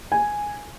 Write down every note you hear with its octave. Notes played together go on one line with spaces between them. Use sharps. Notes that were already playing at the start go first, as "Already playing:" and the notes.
G#5